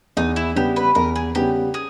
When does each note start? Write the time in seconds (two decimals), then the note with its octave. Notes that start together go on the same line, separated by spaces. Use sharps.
0.17 E2 D#4
0.36 E4
0.56 C#3 G3 B3 G4
0.76 B4
0.95 E2 A#4
1.16 G#4
1.35 C#3 G3 B3 G4
1.74 G#4